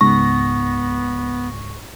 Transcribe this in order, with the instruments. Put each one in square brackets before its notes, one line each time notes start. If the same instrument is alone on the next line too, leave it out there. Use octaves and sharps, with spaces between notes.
[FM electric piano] C#2 G#2 A#6 [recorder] B3 [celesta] C#6